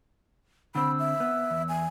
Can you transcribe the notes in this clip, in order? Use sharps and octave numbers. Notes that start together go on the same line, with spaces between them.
D3 C4 B5 E6
E5
B3
E2
G#5